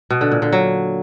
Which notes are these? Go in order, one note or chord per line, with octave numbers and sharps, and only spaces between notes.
B2
D3
A#2
D3
F#3